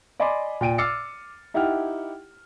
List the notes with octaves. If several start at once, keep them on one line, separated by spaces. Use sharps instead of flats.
D5 D#5 G#5 B5 C6 D6
A#2 G5 D7 D#7
D6 E6 F6 A6 C7 C#7
D#4 E4 G4 F#5 G5 F6